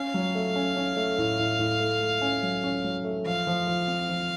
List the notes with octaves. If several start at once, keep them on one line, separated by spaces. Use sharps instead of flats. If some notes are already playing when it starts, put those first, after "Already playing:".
Already playing: C#4 F5
F#3
A3
C#4
C#4
A3
A2
A2
A2
A3
A3
C#4
F#3
C#4
F#3
A3
F3 F5
F3
F3
C4
F3